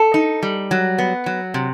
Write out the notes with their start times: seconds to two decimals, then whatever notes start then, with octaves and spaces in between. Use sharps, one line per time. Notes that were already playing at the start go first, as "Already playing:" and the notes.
Already playing: A4
0.14 D#4
0.43 G3
0.71 F#3
0.98 B3
1.26 F#3
1.54 C3